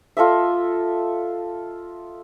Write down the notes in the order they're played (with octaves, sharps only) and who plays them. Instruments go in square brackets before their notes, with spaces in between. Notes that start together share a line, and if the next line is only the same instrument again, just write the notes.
[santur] F4 A4 D#5 E5